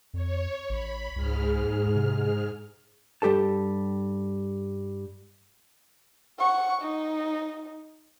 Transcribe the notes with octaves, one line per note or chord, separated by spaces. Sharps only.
F2 C#5
A1 B5
C#2 G#2 G#3 F6
D#2
C3
G2 G3 G4 A4 A5
F#5 C#6
D#4